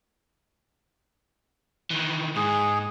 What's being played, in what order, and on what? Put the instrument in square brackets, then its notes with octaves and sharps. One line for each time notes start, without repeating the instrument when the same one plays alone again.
[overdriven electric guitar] D#3 E3
[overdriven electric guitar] G#2 [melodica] G#4